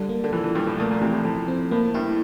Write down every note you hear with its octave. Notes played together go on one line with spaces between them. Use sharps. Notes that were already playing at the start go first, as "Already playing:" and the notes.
Already playing: D3 G3
A#3
D3
E3 F3
E3
G2 F3
A2
A#2 A3
A#2
C3 E3
A2
A2 F3
C4
A2 A#3
G2 E4